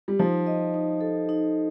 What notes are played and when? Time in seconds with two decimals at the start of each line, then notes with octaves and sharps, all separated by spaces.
0.08 G3
0.19 F3 D#4
0.46 D#5
0.74 D#4
1.01 A4
1.29 D#4